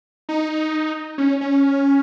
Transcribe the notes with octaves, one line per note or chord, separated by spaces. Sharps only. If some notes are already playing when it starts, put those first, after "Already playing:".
D#4
C#4
C#4